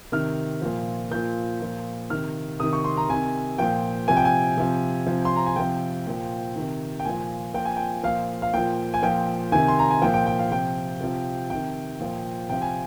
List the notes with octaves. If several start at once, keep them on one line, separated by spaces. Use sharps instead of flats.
C3 D#3 F6
A#2 F3
A#2 F3 G6
A#2 F3
C3 D#3 F6
C3 D#3 D#6
C#6
C6
A#5
C3 D#3 G#5
A#2 F3 G5
C3 F3 G#5
G5
G#5
C3 F3
C3 F3
C6
A#5
G#5
C3 F3 G5
A#2 F3
C3 D#3
G5
A#2 F3 G#5
A#2 F3 G5
G#5
G5
A#2 F3 F5
F5
A#2 F3 G5
G#5
A#2 F3 G5
C3 D#3 G#5
C6
A#5
G#5
A#2 F3 G5
G5
G5
F5
C3 F3 G5
C3 F3
C3 D#3 G5
A#2 F3
C3 F3 G5
G#5